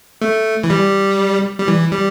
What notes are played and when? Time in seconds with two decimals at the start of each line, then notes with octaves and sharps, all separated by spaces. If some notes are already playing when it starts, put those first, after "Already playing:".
0.22 A3
0.64 E3
0.70 G3
1.59 G3
1.68 E3
1.92 G3